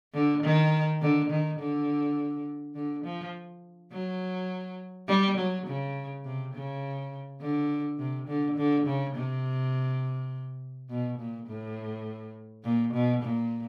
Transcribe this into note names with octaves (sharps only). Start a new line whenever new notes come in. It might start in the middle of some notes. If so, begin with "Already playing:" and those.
D3
D#3
D3
D#3
D3
D3
F3
F#3
G3
F#3
C#3
C3
C#3
D3
C3
D3
D3
C#3
C3
B2
A#2
A2
A#2
B2
A#2